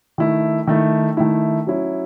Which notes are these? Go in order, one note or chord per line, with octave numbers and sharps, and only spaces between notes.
D#3 A3 E4
D#3 A3 E4
D#3 A3 E4
F#3 C#4 E4